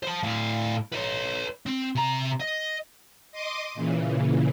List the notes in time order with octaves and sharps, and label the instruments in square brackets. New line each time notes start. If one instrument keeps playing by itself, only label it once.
[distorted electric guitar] C5 A5
A2 F5
B4 C#5
C4
C3 A#5
D#5
[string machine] D#5 C6 D6 D#6
A#2 C#3 E3